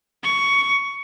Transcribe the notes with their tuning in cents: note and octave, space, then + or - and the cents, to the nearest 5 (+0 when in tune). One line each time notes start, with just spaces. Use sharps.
C#6 +10